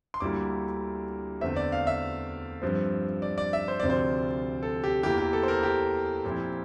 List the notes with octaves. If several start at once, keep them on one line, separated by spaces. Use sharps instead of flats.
C6
D2 D3 G3 A#3 E4 D6
E2 D3 A3 C4 E5
D5
F5
E5
G2 F3 C4
D5
D5
E5
C5
D2 C3 F3 C4 D5
C5
A4
G4
E2 E3 A#3 E4 G4
G4
A4
C5
A#4
G4
A#2 F3 C4 E4